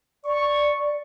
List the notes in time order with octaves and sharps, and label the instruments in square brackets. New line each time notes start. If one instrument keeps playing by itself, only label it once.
[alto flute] D5 [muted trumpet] C#6